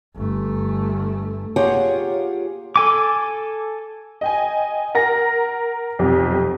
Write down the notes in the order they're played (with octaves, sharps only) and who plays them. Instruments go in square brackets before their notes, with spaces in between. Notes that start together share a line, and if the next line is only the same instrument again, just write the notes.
[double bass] G1 A3
[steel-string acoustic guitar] A#3 F4 G4 G#4 C#5 F#5
[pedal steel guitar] A4 G#5 D6
[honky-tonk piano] D#5 G5 G#5
A#4 F#5 A#6
B1 F2 C3